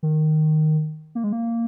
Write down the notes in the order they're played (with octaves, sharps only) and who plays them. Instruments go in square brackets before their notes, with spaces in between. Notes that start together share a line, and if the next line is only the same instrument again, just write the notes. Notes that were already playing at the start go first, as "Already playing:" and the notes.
[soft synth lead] D#3
A#3
G#3
A#3